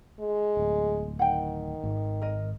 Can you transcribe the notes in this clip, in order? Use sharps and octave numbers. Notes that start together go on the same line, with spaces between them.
G#3
D1
D#3 F#5 G5
G#1
A#4 D#5